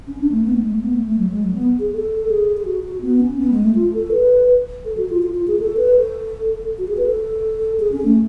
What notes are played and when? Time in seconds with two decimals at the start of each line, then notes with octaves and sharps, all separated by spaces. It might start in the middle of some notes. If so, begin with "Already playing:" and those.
0.07 C#4
0.20 D4
0.32 A3
0.44 B3
0.54 A3
0.63 G#3
0.72 A3
0.82 B3
0.94 A3
1.06 A3
1.18 F#3
1.30 G#3
1.43 F#3
1.54 B3
1.79 G#4
1.92 A4
2.29 G#4
2.57 G#4
2.65 F#4
2.83 F#4
3.01 B3
3.21 C#4
3.38 B3
3.51 G#3
3.63 A3
3.75 F4
3.93 A4
4.12 B4
4.85 A4
4.97 F#4
5.10 F4
5.22 F4
5.34 F4
5.48 G#4
5.60 A4
5.77 B4
5.96 A4
6.78 F#4
6.88 G#4
6.97 B4
7.07 A4
7.80 G#4
7.92 C#4
8.05 A3